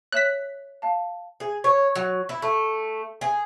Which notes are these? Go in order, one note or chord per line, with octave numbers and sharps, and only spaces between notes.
C#5 E5 F#6 B6 E7
F5 A5
G#4
C#5
F#3
E4
A3
G#4